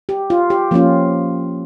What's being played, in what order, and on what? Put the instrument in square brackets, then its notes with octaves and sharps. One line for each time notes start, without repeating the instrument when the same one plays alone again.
[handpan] G4
F4
G4
F3 A#3 C#4 F4